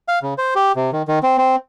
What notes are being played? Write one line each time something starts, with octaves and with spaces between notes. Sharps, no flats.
F5
C#3
C5
G4
C3
D#3
D#3
C4
C4